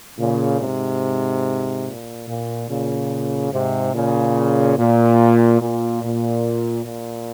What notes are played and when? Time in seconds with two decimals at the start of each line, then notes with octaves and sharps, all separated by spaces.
0.18 A#2 C#3
0.60 G#2 C3
1.86 A#2
2.28 A#2
2.69 A#2 C#3
3.52 G#2 C3
3.94 A#2 C#3
4.78 A#2
5.61 A#2
6.03 A#2
6.86 A#2